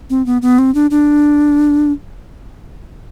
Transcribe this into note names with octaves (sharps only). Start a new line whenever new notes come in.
C4
B3
B3
C4
D4
D4